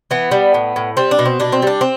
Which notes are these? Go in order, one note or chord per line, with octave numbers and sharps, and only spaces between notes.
E3 B3
G3
A2
A2
G3 C4
D4
B2
C4
B2 D4
C4
G3 D4
C4